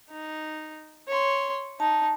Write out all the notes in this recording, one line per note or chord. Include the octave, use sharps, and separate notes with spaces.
D#4
C#5 C6
D#4 A5